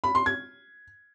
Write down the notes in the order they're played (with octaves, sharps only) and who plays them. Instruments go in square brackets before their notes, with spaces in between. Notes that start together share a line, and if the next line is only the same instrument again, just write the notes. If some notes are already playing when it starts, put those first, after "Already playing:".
[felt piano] B5
C6
G#6